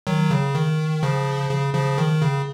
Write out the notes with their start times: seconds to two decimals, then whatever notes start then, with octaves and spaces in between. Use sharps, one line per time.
0.07 D#3 F#3
0.31 C#3
0.55 D#3
1.03 C#3 F3
1.50 C#3
1.74 C#3 F3
1.98 D#3
2.22 C#3